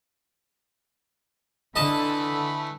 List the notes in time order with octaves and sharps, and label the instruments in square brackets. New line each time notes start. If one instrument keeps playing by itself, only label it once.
[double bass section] D3 [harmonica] E3 A3 [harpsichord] D#5 A5 [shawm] B5